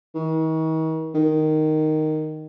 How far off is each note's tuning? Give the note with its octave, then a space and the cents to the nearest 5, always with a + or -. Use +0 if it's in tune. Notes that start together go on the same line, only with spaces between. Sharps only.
D#3 +45
D#3 -5